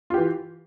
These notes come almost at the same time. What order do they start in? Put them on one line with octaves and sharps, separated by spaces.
F4 G4 E3